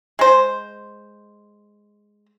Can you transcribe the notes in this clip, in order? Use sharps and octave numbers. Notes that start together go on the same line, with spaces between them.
G#3 C5